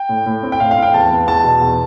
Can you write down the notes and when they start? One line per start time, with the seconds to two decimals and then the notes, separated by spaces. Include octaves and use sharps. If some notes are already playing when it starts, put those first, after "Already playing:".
Already playing: G5
0.09 A2
0.26 A2
0.43 C4
0.52 G5
0.60 A2 F5
0.71 F5
0.77 C4
0.83 G5
0.94 E2 A5
1.11 B3
1.27 E2 A5
1.44 B2
1.61 E2